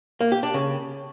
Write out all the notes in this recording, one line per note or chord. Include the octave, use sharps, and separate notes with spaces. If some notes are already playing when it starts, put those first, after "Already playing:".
A#3
G4
D4
C#3